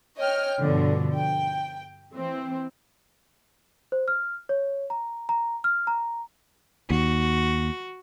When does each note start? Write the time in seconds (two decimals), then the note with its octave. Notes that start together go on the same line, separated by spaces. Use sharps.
0.17 C#5 D#5 G5 F6
0.60 G2 B2 D3 F3
1.17 G5
2.12 E3 C4
3.92 C5
4.08 F6
4.49 C#5
4.90 A#5
5.29 A#5
5.64 F6
5.87 A#5
6.91 D#2 F#4